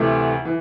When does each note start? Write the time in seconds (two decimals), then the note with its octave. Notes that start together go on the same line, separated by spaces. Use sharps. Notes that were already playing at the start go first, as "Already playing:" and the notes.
Already playing: D2 C3 E3 A3
0.45 E3